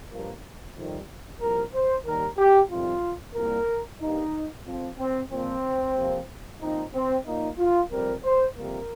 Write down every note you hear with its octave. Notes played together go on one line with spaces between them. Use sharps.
G2 F3 A#3
F2 C3 D#3 G3
C2 A#2 F3 A#4
C5
D#2 D#3 G3 A#4
G4
F2 C3 D#3 G3 F4
C2 A#2 G3 A#3 A#4
G2 G3 A#3 D#4
F2 F3 C4
C4
A#2 F3 A#3 C4
F2 C3 F3 A#3
A#2 F3 C4 D#4
C4
A#2 A#3 D#4
F4
F2 C3 G3 C4 A#4
C5
F2 C3 G3 A#3 A#4